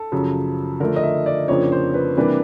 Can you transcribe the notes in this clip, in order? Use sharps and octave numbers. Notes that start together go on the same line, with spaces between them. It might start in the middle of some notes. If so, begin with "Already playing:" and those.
Already playing: A4
F#2 C#3 F3
D3 F3 A3 A#4
D#5
E5
D5
F2 C#3 F3 A#3 D4 C#5
C5
B4
C3 E3 G3 A#3 D4 B4